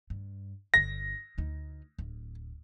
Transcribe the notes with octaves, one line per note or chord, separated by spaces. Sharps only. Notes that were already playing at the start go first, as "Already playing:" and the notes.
G2
G1 D3 A#6
D2 D#4
D1